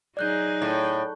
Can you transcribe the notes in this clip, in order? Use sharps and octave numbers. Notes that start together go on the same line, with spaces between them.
F#3 D#4 G#4 D5 F#6 G6
A2